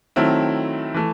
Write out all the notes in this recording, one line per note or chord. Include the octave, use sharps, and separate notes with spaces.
D#3 F#3 A3 C4 E4
E3 A3